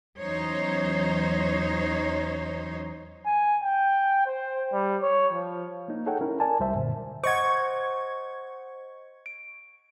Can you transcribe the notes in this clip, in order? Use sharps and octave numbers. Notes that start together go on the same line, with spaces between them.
E2 F#3 C#4 D#4 C5 C#5
G#5
G5
C5
G3
C#5
F3
A#3 D#4
D#4 G#4 A4 C#5 F#5 G5
C#4 E4 A#4
A#4 D5 G#5 A5
C2 G3 C5 E5
F#2 A#2 D3
C5 D#5 F#5 C#6 G#6
D7